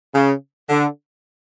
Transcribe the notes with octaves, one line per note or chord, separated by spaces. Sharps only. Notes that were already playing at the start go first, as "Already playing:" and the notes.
C#3
D3